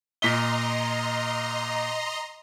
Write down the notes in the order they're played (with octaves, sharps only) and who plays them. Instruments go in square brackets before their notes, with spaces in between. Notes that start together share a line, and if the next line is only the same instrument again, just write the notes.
[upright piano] A#2 B6 G7 [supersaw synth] D#5 A#5 C6